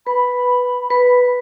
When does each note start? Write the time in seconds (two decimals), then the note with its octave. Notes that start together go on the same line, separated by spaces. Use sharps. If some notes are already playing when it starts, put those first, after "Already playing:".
0.07 B4 B5
0.90 B4